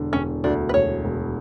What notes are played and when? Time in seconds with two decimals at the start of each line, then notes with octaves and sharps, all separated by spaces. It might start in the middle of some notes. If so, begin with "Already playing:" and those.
Already playing: E1 D3
0.13 E1 C#4
0.44 D2 D4
0.69 B4
0.74 E1 C#5
1.04 E1